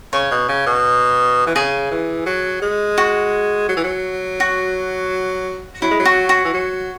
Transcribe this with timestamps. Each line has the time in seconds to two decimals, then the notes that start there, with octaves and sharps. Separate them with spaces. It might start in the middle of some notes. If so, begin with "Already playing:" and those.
0.13 C#3 C#5
0.31 B2
0.49 C#3
0.67 B2
1.47 E3
1.55 C#3 G#4
1.91 E3
2.26 F#3
2.62 G#3
2.98 F#4
3.69 F#3
3.77 E3
3.84 F#3
4.40 F#4
5.82 F#3 E4
5.91 G#3
5.99 F#3
6.05 F#4
6.29 F#4
6.45 E3
6.54 F#3